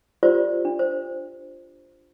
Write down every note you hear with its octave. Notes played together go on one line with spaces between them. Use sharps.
F4 G4 A#4 C5 D5
D4
C5